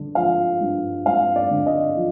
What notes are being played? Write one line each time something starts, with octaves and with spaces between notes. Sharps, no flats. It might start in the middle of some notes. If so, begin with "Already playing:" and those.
Already playing: G2 D3
F3 F5
G2
G2 F5
D5
D3
D#5
F3